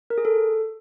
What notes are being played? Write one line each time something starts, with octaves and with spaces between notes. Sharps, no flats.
A#4
G#4
A4